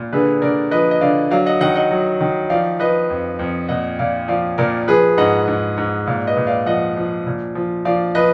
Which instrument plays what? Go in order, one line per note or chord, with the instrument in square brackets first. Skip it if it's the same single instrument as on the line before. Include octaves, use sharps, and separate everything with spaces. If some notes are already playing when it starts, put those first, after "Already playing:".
Already playing: [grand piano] A#2
D3 G#4 B4
D3 A#4 D5
F3 B4 D#5
D#5
D3 D5 F5
F#3 D5 F5
D#5 F#5
D#3 D#5 F#5
D#5 F#5
F#3
D#3
F3 D5 F5
F3 B4 D#5
F2
F2
A#2 D#5 F#5
A#2 D5 F5
F3 D5 F5
A#2 A#4 D5
F3 G#4 B4
G#2 D#5 F#5
G#2
G#2
A#2 D5 F5
B4 D#5
A#2
D5 F5
F3 D#5 F#5
F3
A#2
F3
F3 D5 F5
F3 B4 D#5